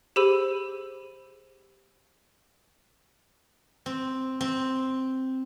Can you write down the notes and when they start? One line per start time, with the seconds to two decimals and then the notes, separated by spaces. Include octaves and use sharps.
0.16 G4 G#4 C5 B5 E6 D#7
3.86 C4
4.41 C4